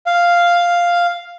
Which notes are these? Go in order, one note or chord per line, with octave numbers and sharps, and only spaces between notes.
F5